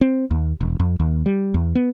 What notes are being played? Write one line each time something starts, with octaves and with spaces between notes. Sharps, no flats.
C4
D#2
E1
F2
D#2
G3
E2
B3